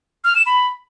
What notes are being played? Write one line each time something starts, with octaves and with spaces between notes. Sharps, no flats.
F6
E7
B5